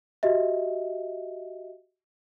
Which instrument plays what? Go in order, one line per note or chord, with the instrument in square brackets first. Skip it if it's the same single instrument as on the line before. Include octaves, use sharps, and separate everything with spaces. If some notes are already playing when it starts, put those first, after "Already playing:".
[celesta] F#4 G4 D#5 E5